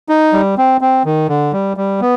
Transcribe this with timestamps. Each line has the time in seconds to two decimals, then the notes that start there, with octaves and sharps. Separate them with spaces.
0.09 D#4
0.33 G3
0.58 C4
0.81 C4
1.05 D#3
1.29 D3
1.53 G3
1.77 G3
2.01 B3